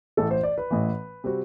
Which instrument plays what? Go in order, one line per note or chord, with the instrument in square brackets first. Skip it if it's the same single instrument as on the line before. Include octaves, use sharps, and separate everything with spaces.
[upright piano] A1 A2 E3 [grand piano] A4
[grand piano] C5
D5
B4
[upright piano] A1 A2 E3
C3 G3 C4 F#4